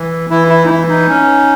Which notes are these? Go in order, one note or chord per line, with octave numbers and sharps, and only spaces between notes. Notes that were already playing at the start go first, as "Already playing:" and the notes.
Already playing: E3
E3 E4
E4
D#4
E3 E4
D#4
C#4